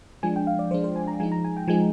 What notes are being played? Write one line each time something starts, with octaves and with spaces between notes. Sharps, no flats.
F3 G#3 D4 G#5
G5
F5
D5
F3 G#3 D4 C5
C5
G#5
A#5
F3 G#3 D#4 G#5
A#5
G#5
G5
F3 G#3 D#4 G#5